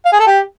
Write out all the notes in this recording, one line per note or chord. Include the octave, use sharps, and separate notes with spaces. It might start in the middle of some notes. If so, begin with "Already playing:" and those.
F5
G#4
A4
G4